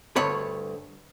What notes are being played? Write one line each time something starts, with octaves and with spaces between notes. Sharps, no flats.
D2 G2 C#5 B5